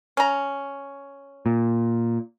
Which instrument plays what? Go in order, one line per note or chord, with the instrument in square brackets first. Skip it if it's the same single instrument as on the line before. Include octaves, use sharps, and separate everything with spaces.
[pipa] C#4 A#5
[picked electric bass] A#2